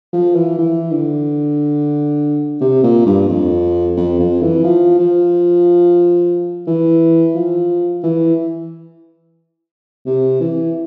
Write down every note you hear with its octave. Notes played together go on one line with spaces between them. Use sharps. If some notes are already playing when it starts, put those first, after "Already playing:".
F3
E3
E3
D3
C3
A#2
G2
F2
F2
F2
E3
F3
F3
E3
F3
E3
C3
E3